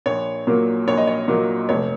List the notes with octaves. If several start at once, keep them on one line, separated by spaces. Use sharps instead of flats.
A#1 C#5
A#2 F#3 A#3
A#1 C#5
D#5
C#5
A#2 F#3 A#3
F1 C#5